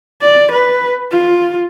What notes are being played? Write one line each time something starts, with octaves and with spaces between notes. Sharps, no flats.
D5
B4
F4